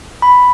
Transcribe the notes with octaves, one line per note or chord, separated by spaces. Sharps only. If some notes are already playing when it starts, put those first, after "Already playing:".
B5